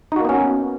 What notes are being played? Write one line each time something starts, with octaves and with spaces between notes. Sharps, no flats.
A#3 B3 C#4 D#4 F#4